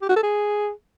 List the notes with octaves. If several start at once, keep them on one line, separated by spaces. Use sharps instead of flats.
G4
F#4
A4
G#4